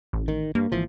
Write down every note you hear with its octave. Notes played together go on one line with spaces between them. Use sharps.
A1
D#3
G2 A#3
G#1 E3 F3